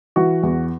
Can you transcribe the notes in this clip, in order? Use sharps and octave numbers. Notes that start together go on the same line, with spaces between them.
E3 F#4
E2